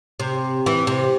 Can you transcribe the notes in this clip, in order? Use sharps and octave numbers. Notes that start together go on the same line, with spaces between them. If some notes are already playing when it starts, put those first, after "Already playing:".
C3
E3
C3